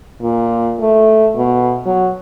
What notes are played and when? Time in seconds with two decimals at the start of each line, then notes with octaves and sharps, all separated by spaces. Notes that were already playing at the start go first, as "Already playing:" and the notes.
0.22 A#2
0.80 A3
1.36 B2
1.86 F#3